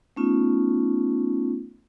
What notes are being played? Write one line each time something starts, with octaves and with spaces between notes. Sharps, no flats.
A3 B3 C#4 D#4 F4